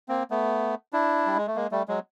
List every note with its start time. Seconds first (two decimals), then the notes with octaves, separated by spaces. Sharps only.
0.08 A#3 C4
0.31 A3 B3
0.93 D4 E4
1.26 G3
1.37 G#3
1.47 A3
1.56 G#3 A#3
1.72 G3 A3
1.88 F#3 G#3